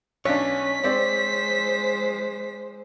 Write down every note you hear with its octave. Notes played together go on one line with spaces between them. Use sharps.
B1 C#4 D4 C#5 B6
G#3 C4 C5 D5